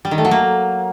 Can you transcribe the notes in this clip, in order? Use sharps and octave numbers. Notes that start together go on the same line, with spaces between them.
G3
D#3
A3
F#3
A#3